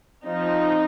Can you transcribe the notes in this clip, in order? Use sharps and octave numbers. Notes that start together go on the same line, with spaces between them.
F3 C4 D#4